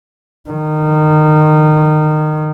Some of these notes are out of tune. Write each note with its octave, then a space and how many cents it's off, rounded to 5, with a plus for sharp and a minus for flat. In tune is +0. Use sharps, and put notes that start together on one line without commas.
D#3 -25